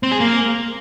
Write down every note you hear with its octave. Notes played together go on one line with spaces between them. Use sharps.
C4
G#4
A#3